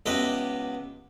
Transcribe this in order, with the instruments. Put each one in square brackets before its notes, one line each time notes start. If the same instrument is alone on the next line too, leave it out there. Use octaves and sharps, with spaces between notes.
[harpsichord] C#2 B3 G4 D#5 E5